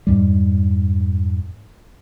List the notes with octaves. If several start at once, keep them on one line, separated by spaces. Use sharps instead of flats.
F2 G#2 G3